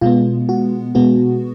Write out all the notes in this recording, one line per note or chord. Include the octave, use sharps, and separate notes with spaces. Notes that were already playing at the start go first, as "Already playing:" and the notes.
B2 G#3 B3 F4
F#4
B2 G#3 B3 F#4